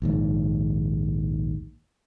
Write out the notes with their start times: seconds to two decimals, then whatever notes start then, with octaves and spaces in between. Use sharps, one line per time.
0.02 A#1 D#2 G#2